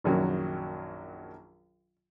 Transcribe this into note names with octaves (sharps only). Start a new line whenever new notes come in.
A#1 F#2 D#3 F#3